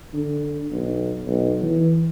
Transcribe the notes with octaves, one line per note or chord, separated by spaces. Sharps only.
D3
B1
B1
E3